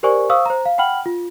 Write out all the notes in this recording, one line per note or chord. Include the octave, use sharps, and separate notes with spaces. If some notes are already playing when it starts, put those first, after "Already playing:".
G4 A#4 C5 D5 G#5 C#6
C5 F5 C#6 D#6 E6
C5 A#5
F5
F#5 G5 B5 F6 F#7
F4